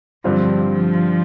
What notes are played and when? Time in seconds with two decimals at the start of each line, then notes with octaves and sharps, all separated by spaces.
0.23 G2 D3 F3 G3 C4 F4
0.71 F3